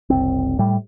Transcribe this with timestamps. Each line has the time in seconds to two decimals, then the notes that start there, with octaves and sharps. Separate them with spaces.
0.10 F#1 C2 C4
0.59 A2 G3